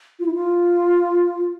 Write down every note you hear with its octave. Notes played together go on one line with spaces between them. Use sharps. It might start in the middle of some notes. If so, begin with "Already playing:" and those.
F4
E4
F4